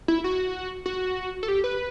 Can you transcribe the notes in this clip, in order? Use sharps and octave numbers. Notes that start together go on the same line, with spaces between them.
E4
F#4
F#4
A4
G4
B4